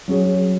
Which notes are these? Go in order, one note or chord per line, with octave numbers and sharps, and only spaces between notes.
F#3 C#4 G#4 C#5